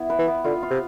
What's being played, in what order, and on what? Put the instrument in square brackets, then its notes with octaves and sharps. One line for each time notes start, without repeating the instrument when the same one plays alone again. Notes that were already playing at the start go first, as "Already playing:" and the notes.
Already playing: [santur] B3 E4
B4
[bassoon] E3
[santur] B3
[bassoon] D3 [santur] F4
[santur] F4
[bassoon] C3